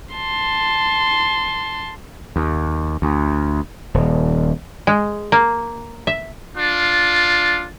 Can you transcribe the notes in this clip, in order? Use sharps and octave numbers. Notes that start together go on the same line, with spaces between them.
A5 C6
D#2
D2
D#1
G#3
A#3
E5
D4 F4